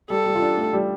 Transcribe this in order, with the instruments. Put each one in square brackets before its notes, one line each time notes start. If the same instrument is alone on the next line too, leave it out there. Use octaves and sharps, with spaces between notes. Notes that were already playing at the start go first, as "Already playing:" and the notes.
[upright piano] G3 [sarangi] A4
[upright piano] G3
F4
D4
A3
G3